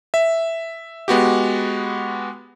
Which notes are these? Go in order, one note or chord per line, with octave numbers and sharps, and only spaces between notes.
E5
G#3 B3 F#4 G4